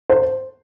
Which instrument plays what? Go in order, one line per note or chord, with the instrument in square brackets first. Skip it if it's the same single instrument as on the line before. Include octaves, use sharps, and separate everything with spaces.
[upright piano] C5